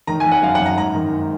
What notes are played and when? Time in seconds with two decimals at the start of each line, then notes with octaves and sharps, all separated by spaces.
0.07 D#3 A#5
0.20 G#5
0.25 D#3
0.32 F#5
0.43 F#2 F5
0.55 F#5
0.60 F#2
0.65 A#5
0.77 G#2 A#5
0.95 D#3
1.12 G#2